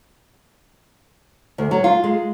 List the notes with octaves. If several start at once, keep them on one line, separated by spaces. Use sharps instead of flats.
D2
F#3
F4
G#3